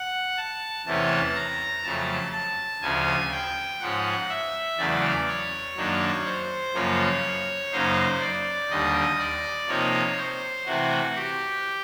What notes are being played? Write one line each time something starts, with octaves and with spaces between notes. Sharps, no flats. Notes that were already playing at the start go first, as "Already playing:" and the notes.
Already playing: F#5
A5
E2 C3 E3 A3 C#4 A5
A#5
F2 C#3 F#3 A3 A5
A5
D2 C#3 F3 G#5
G5
G#2 F3 G#3 C#4 F#5
E5
E2 C#3 F#3 A3 D5
C#5
F#2 D#3 F#3 A#3 D4
C5
F#2 C#3 F3 A#3 C#5
F#2 C#3 F#3 A#3 D#4 C5
D5
D#2 D3 G3 D#5
D5
C3 F3 A#3 D#4 C#5
C5
C3 E3 A3 C4 F#4
G4